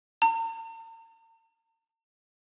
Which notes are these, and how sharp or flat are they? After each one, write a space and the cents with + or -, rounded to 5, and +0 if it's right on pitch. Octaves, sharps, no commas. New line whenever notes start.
A#5 -45